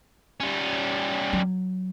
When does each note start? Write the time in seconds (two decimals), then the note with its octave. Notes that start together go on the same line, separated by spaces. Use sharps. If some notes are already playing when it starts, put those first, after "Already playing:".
0.40 G3 C#4
1.33 F#3